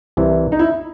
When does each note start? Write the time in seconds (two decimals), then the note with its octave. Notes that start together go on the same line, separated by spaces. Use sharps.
0.17 C2 C3 E3
0.52 D#4
0.59 E4